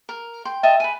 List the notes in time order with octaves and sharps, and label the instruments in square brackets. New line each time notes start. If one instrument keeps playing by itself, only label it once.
[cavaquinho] A#4
G5 C6
D#5 E5 G5 A5
B4 G#5